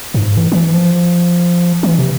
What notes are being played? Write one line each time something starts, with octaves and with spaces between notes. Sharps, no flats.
G2
G#2
E3
E3
F3
E3
C3